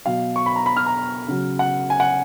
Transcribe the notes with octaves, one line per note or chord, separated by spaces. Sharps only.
B2 F#3 F5
C#6
B5
A#5
B5
F6
A#5
C#3 F#3
F#5
G#5
F#5